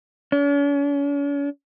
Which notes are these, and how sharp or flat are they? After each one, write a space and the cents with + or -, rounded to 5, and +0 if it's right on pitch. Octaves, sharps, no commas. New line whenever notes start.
C#4 +45